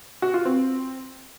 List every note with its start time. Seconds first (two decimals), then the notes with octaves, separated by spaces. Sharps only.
0.22 F#4
0.34 F4
0.45 C4